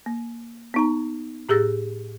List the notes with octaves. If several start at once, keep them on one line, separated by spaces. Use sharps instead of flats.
A#3
B3 D#4 A#5
A2 G4 G#4 E6 A6 A#6